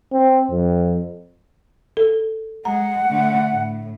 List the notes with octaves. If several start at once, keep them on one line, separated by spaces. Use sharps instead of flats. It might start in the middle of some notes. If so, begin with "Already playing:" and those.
C4
F2
A4
G#3 F#5 A#5
D3 A3
A2